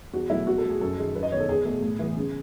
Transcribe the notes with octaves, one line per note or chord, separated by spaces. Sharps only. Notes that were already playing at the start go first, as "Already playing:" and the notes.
E2 F#4
B2 F#3 A3 E4
B2 F#4
A4
A3
G#4
F#2 A4
D#3 G#3
F#2 B4
D#5
D#3 G#3 B3 C#5
A4
E2 G#4
B2 A3
A2
E3 B3
C#3